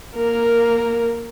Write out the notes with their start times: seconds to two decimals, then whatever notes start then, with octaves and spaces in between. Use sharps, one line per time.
0.15 A#3 A#4